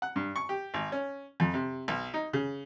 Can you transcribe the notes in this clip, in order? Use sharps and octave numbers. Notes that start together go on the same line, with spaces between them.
F#5
G2
C#6
G4
G#1
C#4
F2
C3
B1
D#4
C#3